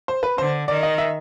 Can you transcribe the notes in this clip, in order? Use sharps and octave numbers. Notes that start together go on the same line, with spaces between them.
C5
B4
D3 C5
D#3 D5
D#5
E5